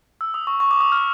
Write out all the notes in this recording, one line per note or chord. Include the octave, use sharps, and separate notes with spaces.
E6
D#6
C#6
C#6
D6
D#6
F6